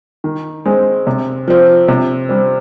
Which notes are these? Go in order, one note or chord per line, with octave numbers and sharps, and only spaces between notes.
D#3
G#3 C4
C3
F3 C4
C3
G3 C4